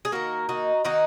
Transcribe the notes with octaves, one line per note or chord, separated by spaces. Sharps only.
G#4
D#3 A#3 F#4 A#4
D#4 F#4
D#3 A#3 D#4 F#4